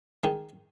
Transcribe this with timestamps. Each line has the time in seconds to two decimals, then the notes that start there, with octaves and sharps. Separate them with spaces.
0.24 D#3 G#3